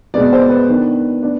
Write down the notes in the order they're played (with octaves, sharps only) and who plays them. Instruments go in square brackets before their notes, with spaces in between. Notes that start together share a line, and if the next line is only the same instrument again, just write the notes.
[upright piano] B2 G#3 B3 D5
C5
B4
D#3 B3 D4
B3 D4 D5